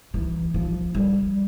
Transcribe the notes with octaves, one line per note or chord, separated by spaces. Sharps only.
E3
F3
G3